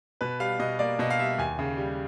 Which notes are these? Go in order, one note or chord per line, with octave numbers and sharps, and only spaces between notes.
B2 B4
G3 F5
B2 D#5
A#3 D5
B2 D#5
F5
G3 E5
D#2 G#5
C#3
G3